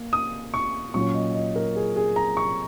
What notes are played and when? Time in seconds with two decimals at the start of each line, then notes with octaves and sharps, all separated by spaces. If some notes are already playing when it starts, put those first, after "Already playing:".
Already playing: A#3
0.13 D#6
0.54 C#6
0.94 A#2 F#3 C#4 C#6
1.14 D#5
1.34 D#5
1.56 A#4
1.76 G#4
1.96 G#4
2.16 A#5
2.37 C#6